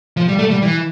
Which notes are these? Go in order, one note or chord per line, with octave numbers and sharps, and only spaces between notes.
F3
G3
A3
G3
E3